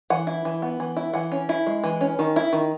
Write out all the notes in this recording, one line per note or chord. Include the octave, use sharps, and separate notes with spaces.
E3 F#5
E4
E3
B3
E3
E4
E3 F#5
C#4
E4
G#3
E3
C#4
D#3
E4
D#3